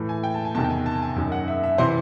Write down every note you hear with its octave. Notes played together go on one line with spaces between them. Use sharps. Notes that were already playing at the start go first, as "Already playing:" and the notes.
Already playing: A2 E3
G#5
G5
A5
G#5
E2 C3 D#3 A5
G5
G#5
A5
G#5
F#2 D#3
F#5
E5
E5
C3 E3 C5